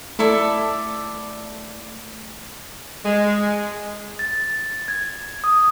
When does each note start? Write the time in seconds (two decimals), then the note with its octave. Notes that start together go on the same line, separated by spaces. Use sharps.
0.19 A3 E4 A4 D5
3.05 G#3
4.19 A6
4.88 G#6
5.44 D#6